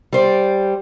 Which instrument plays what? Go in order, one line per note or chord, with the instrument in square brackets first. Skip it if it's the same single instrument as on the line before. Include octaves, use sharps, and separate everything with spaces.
[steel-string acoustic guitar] G3 C5 D5